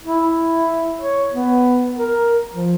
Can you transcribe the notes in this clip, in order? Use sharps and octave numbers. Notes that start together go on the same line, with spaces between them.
E4
C#5
B3
A#4
F3